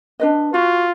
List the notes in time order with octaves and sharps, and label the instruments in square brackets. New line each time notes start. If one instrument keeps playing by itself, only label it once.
[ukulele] D4 B4 D#5
[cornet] F4 [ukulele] F#4